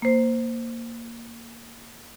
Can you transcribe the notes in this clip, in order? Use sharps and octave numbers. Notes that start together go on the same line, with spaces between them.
A#3 C5